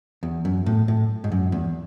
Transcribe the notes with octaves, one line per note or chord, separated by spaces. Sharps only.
E2
F#2
A2
A2
G#2
F#2
E2